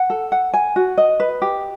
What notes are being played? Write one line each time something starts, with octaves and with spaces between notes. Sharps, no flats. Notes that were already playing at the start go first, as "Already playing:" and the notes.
Already playing: F#5
A4
F#5
G#5
F#4
D#5
B4
G4